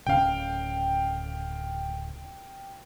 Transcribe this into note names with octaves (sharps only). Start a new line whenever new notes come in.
D1 C#3 C#4 F5 G5